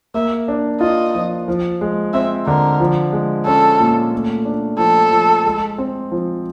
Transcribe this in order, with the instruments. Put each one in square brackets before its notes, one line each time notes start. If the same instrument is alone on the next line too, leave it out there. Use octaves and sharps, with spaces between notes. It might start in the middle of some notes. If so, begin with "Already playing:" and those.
[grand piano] A#3 [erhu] E5
[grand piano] D4
[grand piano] F4 [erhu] D#5
[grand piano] F3
F3
G#3
[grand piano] C4 [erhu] E5
[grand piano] D3 [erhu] A#4
[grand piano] F3
G#3
[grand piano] C#4 [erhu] A4
[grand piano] A#2
A3
D4
[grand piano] F3 [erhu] A4
[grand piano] F3
G#3
C4
F3